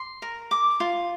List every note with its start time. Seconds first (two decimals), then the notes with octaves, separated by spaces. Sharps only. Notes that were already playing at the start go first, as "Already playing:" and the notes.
Already playing: C6
0.22 A#4
0.51 D6
0.80 F4